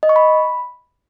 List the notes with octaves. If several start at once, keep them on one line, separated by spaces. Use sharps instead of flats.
D#5
C#6
B5